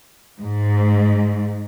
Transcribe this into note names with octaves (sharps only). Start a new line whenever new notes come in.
G#2